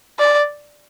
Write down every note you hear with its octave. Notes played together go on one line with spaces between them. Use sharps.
D5